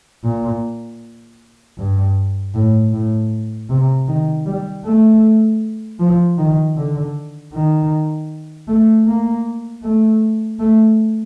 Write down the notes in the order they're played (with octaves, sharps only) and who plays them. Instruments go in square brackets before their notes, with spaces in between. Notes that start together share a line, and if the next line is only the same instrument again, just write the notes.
[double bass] A#2
G2
A2
A2
C3
D#3
G3
A3
F3
D#3
D3
D#3
A3
A#3
A3
A3